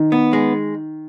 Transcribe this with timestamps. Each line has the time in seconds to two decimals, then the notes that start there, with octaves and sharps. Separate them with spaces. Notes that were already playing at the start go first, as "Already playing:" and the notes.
Already playing: D#3
0.12 B3
0.33 G#3